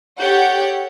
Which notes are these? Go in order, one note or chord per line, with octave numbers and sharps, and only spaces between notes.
G4 A4 C#5 F#5 G6